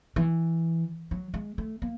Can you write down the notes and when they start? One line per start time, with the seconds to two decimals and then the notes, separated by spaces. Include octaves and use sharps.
0.16 E3
1.11 F#3
1.34 G#3
1.58 A3
1.82 A#3